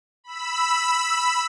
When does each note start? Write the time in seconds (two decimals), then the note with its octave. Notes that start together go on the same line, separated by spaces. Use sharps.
0.24 B5 E6